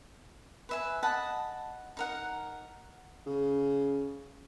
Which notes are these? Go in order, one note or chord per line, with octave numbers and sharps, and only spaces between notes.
B4 E5 G#5
D#5 F#5 A5 B5
D#4 A#4 F#5
C#3